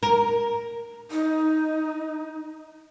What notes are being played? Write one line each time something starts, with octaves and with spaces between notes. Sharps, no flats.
A#4
D#4